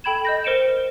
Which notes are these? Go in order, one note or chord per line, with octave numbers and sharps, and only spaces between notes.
A4 G5 B5 G#6 E7
D#5 G6 A#6
A#4 C5 C#7 D7 E7